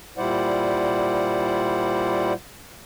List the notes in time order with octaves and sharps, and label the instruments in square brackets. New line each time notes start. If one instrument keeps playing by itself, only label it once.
[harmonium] A#2 G3 E4 C5 D5 F#5